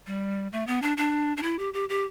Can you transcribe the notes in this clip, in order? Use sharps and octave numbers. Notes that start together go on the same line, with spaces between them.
G3
A3
B3
D4
D4
D4
E4
G4
G4
G4